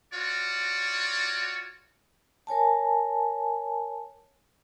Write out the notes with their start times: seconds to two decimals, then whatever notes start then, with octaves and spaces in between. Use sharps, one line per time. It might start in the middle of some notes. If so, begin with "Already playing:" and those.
0.14 F4 F#4 C#5 D5
2.47 A#4 C#5 G#5 A5